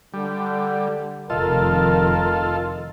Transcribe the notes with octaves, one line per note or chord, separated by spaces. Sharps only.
D3 G3
F1 D#3 F4 A4 A#4 D#5